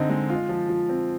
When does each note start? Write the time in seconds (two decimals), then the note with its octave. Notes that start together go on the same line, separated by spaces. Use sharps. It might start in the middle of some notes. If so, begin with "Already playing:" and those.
Already playing: D3 C4 D#4
0.10 G#3
0.30 F4
0.49 F3
0.69 F3
0.89 C4